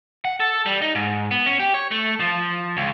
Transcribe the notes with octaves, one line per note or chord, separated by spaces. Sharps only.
F#5
A4
G3
D#4
G#2
B3
C#4
G4
C#5
A3
F3
C#2